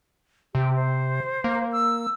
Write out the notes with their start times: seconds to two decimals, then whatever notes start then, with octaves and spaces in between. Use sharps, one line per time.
0.55 C3 G4
0.76 C5
1.44 A#3
1.72 E6